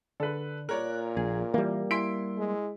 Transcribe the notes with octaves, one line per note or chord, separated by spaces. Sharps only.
D3 A4 B4
A#2 A#4 C#5 D5 F#6
A#1 G#4
E3 G3 A#3
E4 C6 B6 D7
G#3